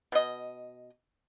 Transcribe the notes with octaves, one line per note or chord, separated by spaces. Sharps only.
B2 D#5